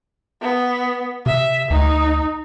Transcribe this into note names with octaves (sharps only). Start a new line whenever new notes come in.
B3
C3 E5
D2 D#4